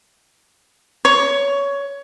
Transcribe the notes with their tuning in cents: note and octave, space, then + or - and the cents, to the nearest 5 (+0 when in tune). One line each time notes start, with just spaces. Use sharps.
C#5 +15